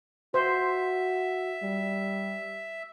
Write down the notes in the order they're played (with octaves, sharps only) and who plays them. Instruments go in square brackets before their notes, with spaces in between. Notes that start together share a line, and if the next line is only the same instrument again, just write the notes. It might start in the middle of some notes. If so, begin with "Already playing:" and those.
[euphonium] F#4 [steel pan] C5 [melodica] E5
[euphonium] G3